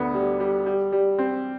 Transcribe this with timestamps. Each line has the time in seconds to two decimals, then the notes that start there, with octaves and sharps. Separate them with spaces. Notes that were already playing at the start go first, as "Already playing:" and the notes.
Already playing: D2 D3 B3
0.14 G3
0.40 G3
0.66 G3
0.92 G3
1.19 C4